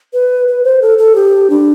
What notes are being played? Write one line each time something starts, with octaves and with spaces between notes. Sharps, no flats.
B4
B4
C5
A4
A4
G4
D4